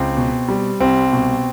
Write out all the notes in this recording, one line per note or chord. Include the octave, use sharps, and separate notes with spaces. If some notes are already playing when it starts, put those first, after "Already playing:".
Already playing: C#2 C4
B2
G3
C2 C4
B2